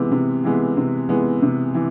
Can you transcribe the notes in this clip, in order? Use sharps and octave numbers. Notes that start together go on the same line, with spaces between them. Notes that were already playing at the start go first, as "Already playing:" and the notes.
Already playing: C3 E3 G#3 B3
C3
E3 G#3 B3
C3
E3 G#3 B3
C3
E3